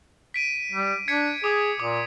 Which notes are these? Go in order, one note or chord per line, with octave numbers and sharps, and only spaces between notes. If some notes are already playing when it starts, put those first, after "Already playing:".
B6 D7 D#7
G3
D4 G#6 B6 C#7
G#4 D6 D#6
A#2 D6